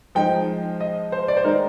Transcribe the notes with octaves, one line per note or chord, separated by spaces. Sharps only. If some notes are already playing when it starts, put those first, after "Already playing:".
F3 G#3 D#4 G5
D#5
C5
D5
C5
D#3 G#3 D#4 A#4